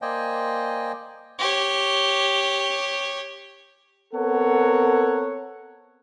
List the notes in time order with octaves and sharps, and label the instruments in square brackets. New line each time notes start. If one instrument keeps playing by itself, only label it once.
[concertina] A#3 C5 D5 D#5 G5 G#5
[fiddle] G4 C#5
[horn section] B3 C4 A4 A#4 C#5 F#5